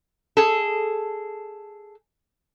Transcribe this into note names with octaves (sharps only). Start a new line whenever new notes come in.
G#4 A4